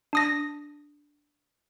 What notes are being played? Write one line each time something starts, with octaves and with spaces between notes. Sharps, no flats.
D4 D#6 A#6